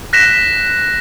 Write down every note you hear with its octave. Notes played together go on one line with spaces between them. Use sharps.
F#6 A#6 B6 E7